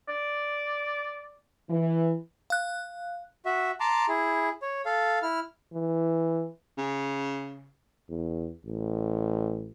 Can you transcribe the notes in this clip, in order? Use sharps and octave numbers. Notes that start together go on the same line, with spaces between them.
D5
E3
F5 F#6
F#4 E5
A5 A#5 C6 D6
E4 G#4
C#5
A4 F5
E4 F6
E3
C#3
E2
A1